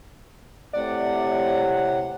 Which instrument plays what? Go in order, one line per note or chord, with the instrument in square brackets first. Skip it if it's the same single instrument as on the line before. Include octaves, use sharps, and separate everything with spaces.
[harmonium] A2 C3 F#5 [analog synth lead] D5